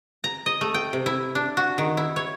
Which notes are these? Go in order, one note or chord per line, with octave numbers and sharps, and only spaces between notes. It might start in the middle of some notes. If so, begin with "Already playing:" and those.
A#5
D#5
A3
G5
C3
E4
D4
F#4
D#3
E4
C#5